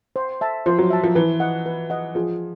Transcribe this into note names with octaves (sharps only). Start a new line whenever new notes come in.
C5
E5 A5
F3 C5
F#3
E5 A5
F3
E3 B4
D#5 F#5
B4
D#5 F#5
F3 G#4